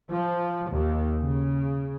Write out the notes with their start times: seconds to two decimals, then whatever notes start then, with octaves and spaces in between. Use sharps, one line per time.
0.11 F3
0.71 D#2
1.20 C#3